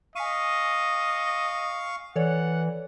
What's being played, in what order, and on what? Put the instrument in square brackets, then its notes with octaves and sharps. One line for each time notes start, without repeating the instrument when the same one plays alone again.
[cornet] D#5 [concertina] F5 C#6 [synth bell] G#5 B6 D#7
[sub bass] E3 [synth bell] A4 C#5 D5 [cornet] F#5